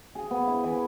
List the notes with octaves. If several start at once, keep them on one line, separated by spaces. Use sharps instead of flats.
G#4
B3
E4
E3